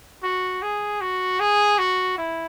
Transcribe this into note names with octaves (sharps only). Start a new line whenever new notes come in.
F#4
G#4
F#4
G#4
F#4
E4